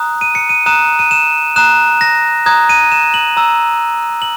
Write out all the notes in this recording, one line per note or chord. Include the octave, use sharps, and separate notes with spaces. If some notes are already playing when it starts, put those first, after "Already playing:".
Already playing: A#5 D#6 F#6
D#7
C#7
D#7
A#5 D#6 F#6 E7
D#7
E7
A#5 D#6 F#6 E7
A#6
A#5 D#6 F#6 G#6
D#7
E7
F#7
A#5 E6
F#7